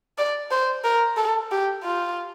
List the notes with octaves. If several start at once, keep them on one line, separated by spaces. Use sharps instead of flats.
D5
C5
A#4
A4
G4
F4